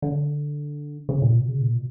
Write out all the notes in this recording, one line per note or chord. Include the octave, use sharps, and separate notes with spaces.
D3
C#3
A#2
B2
C#3
A#2
B2